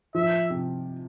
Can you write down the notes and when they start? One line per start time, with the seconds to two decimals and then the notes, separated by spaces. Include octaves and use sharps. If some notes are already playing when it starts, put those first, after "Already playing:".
0.15 F3 E5
0.50 C3